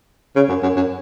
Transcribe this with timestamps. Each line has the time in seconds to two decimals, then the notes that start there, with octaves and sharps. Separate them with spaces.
0.36 C#3
0.49 F#2
0.63 F#2
0.76 F#2